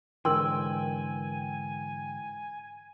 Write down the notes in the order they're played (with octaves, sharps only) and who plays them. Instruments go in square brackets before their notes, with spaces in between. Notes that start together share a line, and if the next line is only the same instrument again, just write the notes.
[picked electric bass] G#2 D3 E3 [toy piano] A#4 C6 [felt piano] G5 [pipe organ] G#5